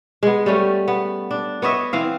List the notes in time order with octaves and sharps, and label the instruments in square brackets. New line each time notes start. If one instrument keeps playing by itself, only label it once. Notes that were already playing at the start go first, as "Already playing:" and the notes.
[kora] G#3 B3
G3 A3 C#4
B3
D4
B3 C#5 D#5 E5
E3 C4 F5